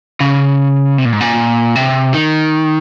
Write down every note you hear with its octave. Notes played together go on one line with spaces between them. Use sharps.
C#3
C3
A#2
G#2
A#2
C3
D#3